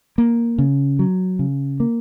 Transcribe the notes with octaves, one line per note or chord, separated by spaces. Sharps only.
A#3
C#3
F#3
C#3
A#3